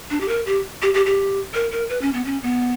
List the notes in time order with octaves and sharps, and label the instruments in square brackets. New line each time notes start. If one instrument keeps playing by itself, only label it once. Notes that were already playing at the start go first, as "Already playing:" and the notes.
[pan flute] D4
G4
A#4
G4
G4
G4
G4
A#4
A#4
B4
C#4
B3
C#4
B3